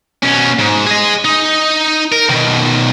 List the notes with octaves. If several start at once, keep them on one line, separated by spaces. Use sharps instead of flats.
B2 C#4
G#2
G#4 D#5
D#4
A#4
B2 D#3